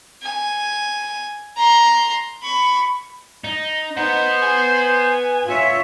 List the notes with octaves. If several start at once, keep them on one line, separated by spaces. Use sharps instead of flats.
G#5
A#5 C6
B5 C#6
D#4
D#4 B4 C5 F#5
G#5
F4 C#5 E5